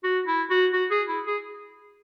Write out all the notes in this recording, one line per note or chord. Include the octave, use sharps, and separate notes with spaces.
F#4
E4
F#4
F#4
G#4
E4
G#4